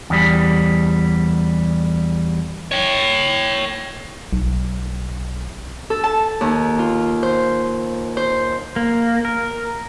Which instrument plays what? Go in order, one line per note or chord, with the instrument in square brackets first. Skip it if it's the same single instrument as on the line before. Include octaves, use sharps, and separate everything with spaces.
[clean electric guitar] E2 G3
[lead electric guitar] C#5 G5
[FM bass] B1
[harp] A4
A5
D#2
F4
C5
C5
[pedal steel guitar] A#3
A#4